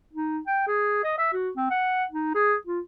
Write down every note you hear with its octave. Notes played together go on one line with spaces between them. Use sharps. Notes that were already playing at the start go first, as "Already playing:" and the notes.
D#4
G5
G#4
D#5
E5
F#4
C4
F#5
D#4
G#4
F4